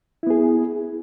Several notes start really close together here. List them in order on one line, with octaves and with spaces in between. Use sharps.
E4 B3 G#4